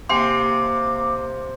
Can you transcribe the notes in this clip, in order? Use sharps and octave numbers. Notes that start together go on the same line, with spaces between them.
C3 A#3 G5 G#5 C6 D6